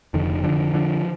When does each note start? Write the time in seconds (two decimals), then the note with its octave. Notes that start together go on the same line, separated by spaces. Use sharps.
0.14 F1 F2 D3 D#3
0.44 D3 F3
0.74 D3 F3